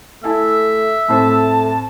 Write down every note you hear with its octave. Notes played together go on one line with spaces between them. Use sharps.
A3 E4 E5 G#5 A5
A2 A3 C4 C5 A5